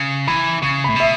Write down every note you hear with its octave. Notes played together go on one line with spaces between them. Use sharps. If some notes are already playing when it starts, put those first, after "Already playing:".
Already playing: C#3
E3 B5
C#3 C#6
A2 B5
B2 E5